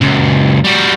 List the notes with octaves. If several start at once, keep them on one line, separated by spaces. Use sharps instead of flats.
C#2 F#2
G3 F#4